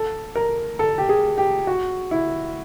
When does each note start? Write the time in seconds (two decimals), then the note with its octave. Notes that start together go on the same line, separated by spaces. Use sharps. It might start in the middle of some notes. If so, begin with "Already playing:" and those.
Already playing: A4
0.36 A#4
0.79 A4
0.98 G4
1.09 G#4
1.38 G4
1.67 F#4
2.11 E4